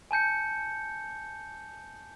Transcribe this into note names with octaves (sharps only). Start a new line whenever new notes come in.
G#5 A5 G6 C#7